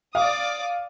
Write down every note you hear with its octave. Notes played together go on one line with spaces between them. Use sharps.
D5 F5 D6 D#6